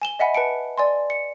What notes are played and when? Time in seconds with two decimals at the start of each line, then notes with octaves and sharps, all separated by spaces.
0.02 G#5 E7 G7
0.19 D#5 E5 F#5 G#5 B5
0.34 B4 A5 C#7 D7
0.78 D5 G#5 C6
1.10 C#7